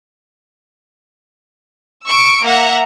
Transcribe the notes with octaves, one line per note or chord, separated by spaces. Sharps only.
C#6 E6 C#7 D7
A#3 E5 F#5 A#5